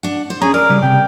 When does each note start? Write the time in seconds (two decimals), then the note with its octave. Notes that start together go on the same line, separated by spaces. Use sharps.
0.03 D4 F#5
0.30 C5
0.42 C#4 G#4 A#5
0.54 A#4 D5
0.70 C#3 G3
0.83 C3 G5